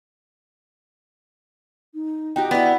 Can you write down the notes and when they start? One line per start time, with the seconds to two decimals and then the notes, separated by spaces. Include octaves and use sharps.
1.94 D#4
2.36 D#4 F#4 G4 G5
2.51 B3 E4 B4 D5